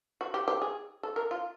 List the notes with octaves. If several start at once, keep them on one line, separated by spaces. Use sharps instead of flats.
F#4
G4
G4
G#4
A4
A#4
F4